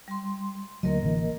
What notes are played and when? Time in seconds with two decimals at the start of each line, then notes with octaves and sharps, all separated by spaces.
0.08 G3 C6
0.83 D2 F#3 A#3 A#4 D#5
1.02 A1 D3 E3